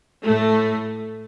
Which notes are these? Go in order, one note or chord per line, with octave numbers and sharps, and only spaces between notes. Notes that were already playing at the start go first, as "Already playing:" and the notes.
A2 A3